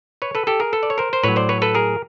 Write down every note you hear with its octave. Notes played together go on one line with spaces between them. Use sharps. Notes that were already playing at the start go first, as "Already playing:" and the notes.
B4 C#5
A4 B4
G4 A4
G#4 A#4
A4 B4
D5
C#5
A#4 C5
C5
A2 F#3 B4 C#5
C5 D5
B4 C#5
A4 B4
G#4 A#4